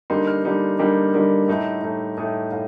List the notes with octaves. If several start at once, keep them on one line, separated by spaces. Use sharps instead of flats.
D3 G3 A#3 D#4 C6
F6
D3 G3 A#3 D#4
D3 G3 A#3 D#4
D3 G3 A#3 D#4
A2 A3 D#4
A2 A3 D#4
A2 A3 D#4 D#6
A2 F5